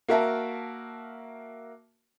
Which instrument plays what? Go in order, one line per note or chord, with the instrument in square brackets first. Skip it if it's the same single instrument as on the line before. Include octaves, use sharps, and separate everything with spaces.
[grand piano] A#3 F#4 A#4 E5 A5